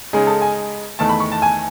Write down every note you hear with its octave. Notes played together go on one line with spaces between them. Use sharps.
C#3 G#3 D#4 G#4
A4
G#5
E2 D#3 A3 A5
B5
C#6
A5
G#5